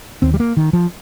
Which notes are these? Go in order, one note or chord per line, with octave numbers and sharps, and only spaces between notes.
D#2 C4
G3
A#3
D#3
F3